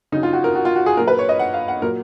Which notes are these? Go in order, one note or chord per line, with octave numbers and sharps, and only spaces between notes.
C#3 F#3 D#4
F4
F#4
A#4
F#4
F4
F#4
G#4
A#2 F#3 A#4
B4
C#5
D#5
F#5
F5
F#5
A#2 F#3 A#4